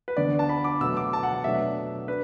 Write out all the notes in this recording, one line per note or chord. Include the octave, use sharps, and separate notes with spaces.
B4
D2 D3 B3 D4 D5
A5
B5
D6
B2 F#3 A3 E6
D6
A5
F#5
F#5
B2 F#3 A3 D4 E5
D4 B4